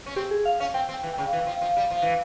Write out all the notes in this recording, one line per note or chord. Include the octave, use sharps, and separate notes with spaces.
C#4
C4 G4
G#4
F5
C#4 F5
C4 G5
C4
G5
E3
C#3 G5
E3
F3
F3
G3
F3
E3